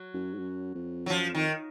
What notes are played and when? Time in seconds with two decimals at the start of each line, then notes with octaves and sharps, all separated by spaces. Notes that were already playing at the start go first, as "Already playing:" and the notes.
Already playing: F#3
0.15 F#2
0.34 G#2
0.39 F#2
0.75 F2
1.06 F#3
1.10 F#2 F3
1.29 F2
1.35 D#3